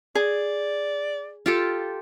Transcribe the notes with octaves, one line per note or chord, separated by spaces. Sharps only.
G#4 D5
F4 G4 A4